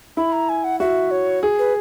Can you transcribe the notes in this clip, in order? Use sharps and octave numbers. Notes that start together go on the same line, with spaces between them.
E4 B5
A#5
G#5
F#5
F#4 E5
C#5
G#4
B4